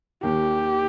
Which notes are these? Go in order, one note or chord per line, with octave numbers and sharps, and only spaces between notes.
D#2 D#3 G4